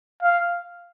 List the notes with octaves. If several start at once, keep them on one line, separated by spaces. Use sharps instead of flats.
F5